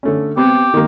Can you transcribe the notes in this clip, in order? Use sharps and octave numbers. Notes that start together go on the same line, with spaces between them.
D3 A3 C#4
B3 C4 G4
D#3 A#3